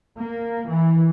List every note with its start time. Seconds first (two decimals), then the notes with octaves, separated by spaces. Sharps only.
0.18 A#3
0.67 E3